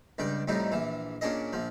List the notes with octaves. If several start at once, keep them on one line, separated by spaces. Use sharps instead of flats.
C#2 G2 D5 G5
F2 A2 G3 D#4
A#1 E3
A#2 C#4 D4 G#4 D#5
A#1 F3